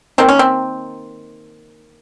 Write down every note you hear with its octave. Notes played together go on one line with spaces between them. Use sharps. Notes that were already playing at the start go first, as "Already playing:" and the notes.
D#3 A#3 C4
C#4
C4